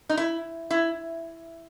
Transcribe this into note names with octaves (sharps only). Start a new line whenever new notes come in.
D#4
E4
E4